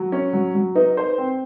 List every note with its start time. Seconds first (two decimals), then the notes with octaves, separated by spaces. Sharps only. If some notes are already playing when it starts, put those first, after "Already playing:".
Already playing: F#3
0.12 C#4
0.33 F#3
0.55 F#3
0.75 D#4 B4
0.97 C5
1.18 C4